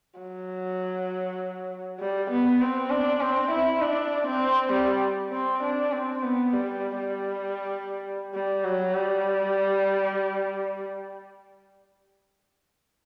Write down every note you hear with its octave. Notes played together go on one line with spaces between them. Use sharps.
F#3
G3
B3
C4
D4
C4
E4
D4
C4
G3
C4
D4
C4
B3
G3
G3
G3
F#3
G3